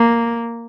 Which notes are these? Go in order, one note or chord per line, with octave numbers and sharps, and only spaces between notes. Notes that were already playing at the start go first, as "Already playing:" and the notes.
Already playing: A#3